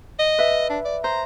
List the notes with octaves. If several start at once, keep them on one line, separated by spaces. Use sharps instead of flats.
D#5
B4 E5
D4
D5
C5 A#5